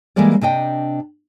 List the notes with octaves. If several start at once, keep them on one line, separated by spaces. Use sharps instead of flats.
E3 G3 G#3 A#3 A#4 D5
C3 D4 D#5 G5